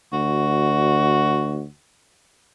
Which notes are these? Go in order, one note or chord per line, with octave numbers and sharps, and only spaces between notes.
D2 F#4